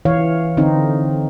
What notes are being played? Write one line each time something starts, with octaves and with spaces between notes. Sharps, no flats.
E3 C#5 F5
D3 C4 D#4